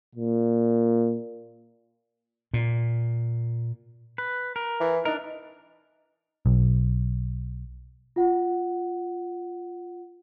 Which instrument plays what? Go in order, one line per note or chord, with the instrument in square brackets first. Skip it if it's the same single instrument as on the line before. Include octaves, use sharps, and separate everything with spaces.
[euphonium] A#2
[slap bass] A#2
[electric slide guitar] B4
A#4
[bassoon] E3
[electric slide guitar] D4 A#4 [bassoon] D#4
[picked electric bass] B1
[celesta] F4 F#5